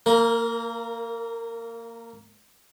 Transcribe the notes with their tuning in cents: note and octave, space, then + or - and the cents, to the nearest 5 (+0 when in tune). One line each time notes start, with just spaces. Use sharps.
A#3 -20 A#4 +15